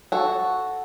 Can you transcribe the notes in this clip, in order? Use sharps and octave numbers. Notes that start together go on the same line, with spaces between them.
F#4 A4